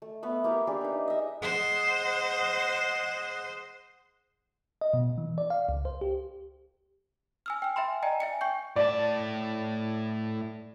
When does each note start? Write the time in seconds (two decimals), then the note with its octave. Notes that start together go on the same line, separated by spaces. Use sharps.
0.02 A3
0.23 A3 B3 B4
0.44 A#3 E4 G4 F5
0.67 D4 G4 G#4
0.81 D#4 B4
1.08 D#5 E5
1.42 G#4 C5 D#5 F#5
4.81 D#5
4.94 B2
5.18 E3
5.38 D5
5.50 F5
5.69 C#2
5.85 C5
6.01 G4
7.46 G#5 E6 F6
7.62 G5 F6
7.76 E5 G5 G#5 B5 C6
8.02 D5 D#5 G5 G#5 A#5
8.20 E5 G#5 C#7
8.41 G5 C#6 G6
8.76 A2 D5 A5